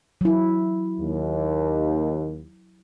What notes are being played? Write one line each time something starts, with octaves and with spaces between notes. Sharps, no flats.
F#3 E4
D#2